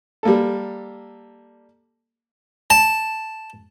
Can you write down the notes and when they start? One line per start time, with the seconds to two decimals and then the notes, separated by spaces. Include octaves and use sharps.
0.23 G3 A#3 A4
2.70 A5